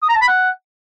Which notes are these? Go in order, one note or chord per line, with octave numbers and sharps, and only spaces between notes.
D#6
A#5
A5
B5
F#5